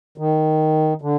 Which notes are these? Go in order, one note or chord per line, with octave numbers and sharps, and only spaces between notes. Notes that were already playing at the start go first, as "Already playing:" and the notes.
D#3
D3